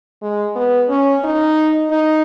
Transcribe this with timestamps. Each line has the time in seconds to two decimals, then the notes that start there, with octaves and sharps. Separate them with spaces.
0.22 G#3
0.56 B3
0.89 C#4
1.24 D#4
1.91 D#4